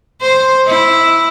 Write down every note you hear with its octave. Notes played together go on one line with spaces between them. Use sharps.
C5
E4